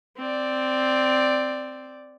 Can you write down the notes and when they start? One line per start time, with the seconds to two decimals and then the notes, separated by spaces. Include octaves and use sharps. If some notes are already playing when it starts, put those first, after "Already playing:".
0.17 C4 D5